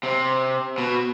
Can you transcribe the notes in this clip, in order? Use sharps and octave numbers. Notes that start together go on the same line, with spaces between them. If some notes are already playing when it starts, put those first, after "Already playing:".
C3
B2